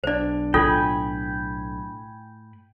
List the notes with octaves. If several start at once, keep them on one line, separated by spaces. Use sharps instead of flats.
B1 D4 C5 D5
A2 F4 A4 G5 G#5 B5